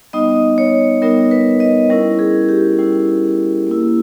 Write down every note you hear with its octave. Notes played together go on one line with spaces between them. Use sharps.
G3 B3 D#4 D#5
C#5
G3 B3 D#4 A#4
B4
D#5
G3 C#4 E4 A#4
G#4
G4
G3 C#4 E4
A#3 E4